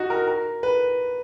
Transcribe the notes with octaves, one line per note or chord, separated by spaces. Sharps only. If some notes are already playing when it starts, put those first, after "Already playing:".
Already playing: D#4 F#4
A#4
A#4
B4